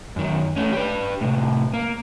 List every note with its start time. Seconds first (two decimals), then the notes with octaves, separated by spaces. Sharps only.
0.16 F#2 D#3
0.56 A3 C#4
0.72 G4 B4
1.21 A2 C3
1.74 A#3